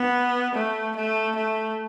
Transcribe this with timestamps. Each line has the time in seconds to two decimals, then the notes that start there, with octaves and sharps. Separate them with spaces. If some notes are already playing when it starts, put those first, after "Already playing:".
Already playing: B3
0.55 A3
0.96 A3
1.36 A3